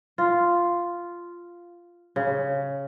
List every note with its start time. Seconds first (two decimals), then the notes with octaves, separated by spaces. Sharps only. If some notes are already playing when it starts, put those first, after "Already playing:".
0.18 F4
2.16 C#3